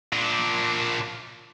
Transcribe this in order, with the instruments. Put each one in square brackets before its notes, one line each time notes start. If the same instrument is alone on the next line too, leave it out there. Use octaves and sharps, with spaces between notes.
[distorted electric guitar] A#2 D4